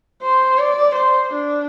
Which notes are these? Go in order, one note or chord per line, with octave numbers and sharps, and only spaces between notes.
C5
D5
C5
D4